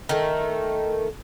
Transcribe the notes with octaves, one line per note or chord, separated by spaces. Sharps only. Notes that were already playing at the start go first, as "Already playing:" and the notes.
D#3 A3